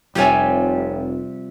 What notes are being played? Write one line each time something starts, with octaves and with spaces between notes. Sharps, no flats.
F1 C3 F3 G3 G4 C#5 G#5